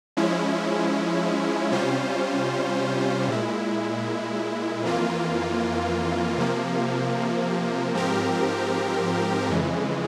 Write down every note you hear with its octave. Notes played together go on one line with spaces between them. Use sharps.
F3 G#3 C#4 E4
C3 G3 C#4 F4 C5
A#2 G#3 E4
F2 E3 A#3 F4
C3 F3 A#3
G#2 F3 C4 G4 A#4
F2 C#3 E3 G#3